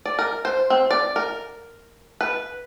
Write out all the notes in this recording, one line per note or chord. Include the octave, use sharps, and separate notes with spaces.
D5
A#4
C5
C4
D5
A#4
B4